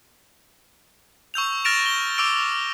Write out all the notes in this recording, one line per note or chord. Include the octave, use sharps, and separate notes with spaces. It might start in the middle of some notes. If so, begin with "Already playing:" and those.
C#6 E6 G6 F7
F6 A6 A#6 D7 E7 F7
G7
D6 E6 D7